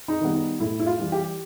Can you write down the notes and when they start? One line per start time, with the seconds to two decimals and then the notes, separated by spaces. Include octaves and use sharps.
0.08 D#4
0.21 D#3 G3 B3
0.34 D#4
0.60 A2 E4
0.80 E4
0.86 F4
0.99 E3 G3
1.12 G4